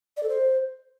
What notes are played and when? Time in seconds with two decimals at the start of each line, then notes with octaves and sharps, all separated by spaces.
0.17 D5
0.23 A4
0.29 C5